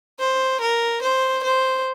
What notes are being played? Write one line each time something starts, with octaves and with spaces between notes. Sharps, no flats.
C5
A#4
C5
C5